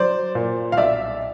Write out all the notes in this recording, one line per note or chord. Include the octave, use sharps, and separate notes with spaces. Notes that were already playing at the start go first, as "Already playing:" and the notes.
Already playing: F#3 C5 D5
A#2
F5
B1 D5 E5